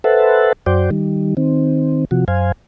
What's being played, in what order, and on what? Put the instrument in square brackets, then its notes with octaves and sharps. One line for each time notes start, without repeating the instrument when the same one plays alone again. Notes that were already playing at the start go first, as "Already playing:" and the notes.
[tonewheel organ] A4 B4 C5 E5 F#5 A5
F#2 F#4 C5 D5 G5
D#3 G3
D#3 C4
C3 F3 F#4
F#2 C5 F5 G#5